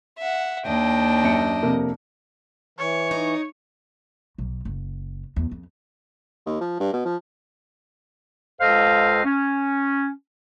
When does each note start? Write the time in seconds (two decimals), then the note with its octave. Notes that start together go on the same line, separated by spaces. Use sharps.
0.18 E5 F#5
0.66 D#2 D4 D#5 G5
1.24 F#2 C#7
1.63 F2 C3 A#3
2.78 E3 C#5
3.11 D#4
4.38 B1
4.65 F#1
5.36 E2
5.51 F2
6.46 D#2
6.61 F3
6.80 G2
6.93 B2
7.05 F3
8.61 C#2 A4 C5 D#5 F5
9.25 C#4